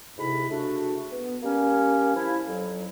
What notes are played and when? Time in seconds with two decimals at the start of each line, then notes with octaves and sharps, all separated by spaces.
0.17 D2 G#2 C3 E4 B5
0.50 C#3 A3 D4 F#4
1.12 B3
1.43 G3 A#3 C#4
2.16 F3 E4
2.48 F2 F#3